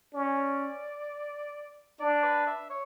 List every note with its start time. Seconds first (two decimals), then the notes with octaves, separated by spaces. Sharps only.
0.14 C#4 D5
2.00 D4 D5
2.23 B4
2.47 E5
2.70 C#5